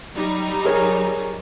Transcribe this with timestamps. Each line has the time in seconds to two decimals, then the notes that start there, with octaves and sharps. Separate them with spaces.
0.13 F#3 G3 D#4
0.65 G#4 A#4 C#5